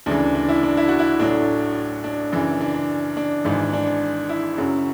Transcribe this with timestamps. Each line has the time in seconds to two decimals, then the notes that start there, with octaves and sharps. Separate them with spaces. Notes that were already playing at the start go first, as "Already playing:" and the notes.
0.06 D2 C#3 E3 D4
0.35 D4
0.48 E4
0.63 D4
0.77 E4
0.88 F#4
0.99 E4
1.20 A1 A2 F#3 A3 D4
2.04 D4
2.32 F#2 C#3 E3
2.61 D4
2.74 D4
3.17 D4
3.45 G#1 G#2 E3
3.73 D4
4.29 E4
4.58 F#2 C#3 F#3